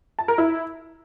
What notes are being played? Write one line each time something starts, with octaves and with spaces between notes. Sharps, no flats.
A5
A#4
E4